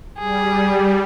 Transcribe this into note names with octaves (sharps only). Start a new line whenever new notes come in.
G3 G#4